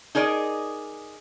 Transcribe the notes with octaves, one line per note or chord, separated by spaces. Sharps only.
D#4 G#4 A#4 D5 D#5